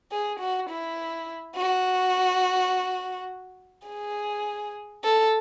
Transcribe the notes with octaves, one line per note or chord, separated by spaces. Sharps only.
G#4
F#4
E4
F#4
G#4
A4